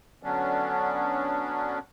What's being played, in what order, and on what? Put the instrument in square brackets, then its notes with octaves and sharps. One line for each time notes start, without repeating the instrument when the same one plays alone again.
[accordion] D3 F#3 B3 C#4 D4